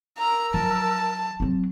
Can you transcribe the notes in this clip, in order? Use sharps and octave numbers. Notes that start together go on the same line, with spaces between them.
A#4 A#5 E6
F3 F#3 A5
F#3 C4